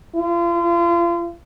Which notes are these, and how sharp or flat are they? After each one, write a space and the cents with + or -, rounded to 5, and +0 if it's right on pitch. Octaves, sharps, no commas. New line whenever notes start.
F4 -35